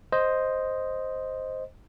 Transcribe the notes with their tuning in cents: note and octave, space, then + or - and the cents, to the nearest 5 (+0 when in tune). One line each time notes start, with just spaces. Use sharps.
C5 +0 D#5 +0